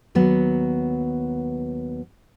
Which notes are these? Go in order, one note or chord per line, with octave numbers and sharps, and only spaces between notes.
D#2 F#3 B3